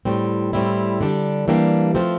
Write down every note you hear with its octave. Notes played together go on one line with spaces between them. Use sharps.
A2 G3 C4
A2 G3 C4 E4
D3 G3 D4 G4
E3 G3 A#3 D4 G4
F3 A3 C4